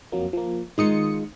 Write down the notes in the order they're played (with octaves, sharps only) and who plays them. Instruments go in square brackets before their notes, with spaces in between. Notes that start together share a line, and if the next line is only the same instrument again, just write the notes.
[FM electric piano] F2 F#3 A#3
F3 A#3
[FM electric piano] D#3 D#6 C#7 [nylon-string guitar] G#3 D#4 F4